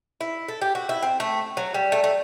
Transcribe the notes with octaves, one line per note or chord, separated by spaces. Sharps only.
E4
A4
G4
F#4
E4
C4
A3
F#3
G3
A3
A3